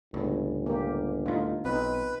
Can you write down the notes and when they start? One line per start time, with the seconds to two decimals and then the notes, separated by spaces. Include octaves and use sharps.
0.14 G1 C#2 A2
0.66 A#3 G4
1.26 D2 A2 D#4 F4
1.65 B1 C4 D#4 B4